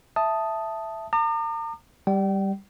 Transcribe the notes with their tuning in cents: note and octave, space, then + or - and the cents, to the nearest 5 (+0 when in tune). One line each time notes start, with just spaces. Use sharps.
E5 +5 A5 +0 D#6 +0
A#5 -40 D6 +45
G3 +0 G5 -35